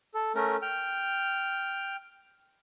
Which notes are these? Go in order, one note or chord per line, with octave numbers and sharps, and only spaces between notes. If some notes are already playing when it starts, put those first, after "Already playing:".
A4
A3 C#4 A#4
G5 F6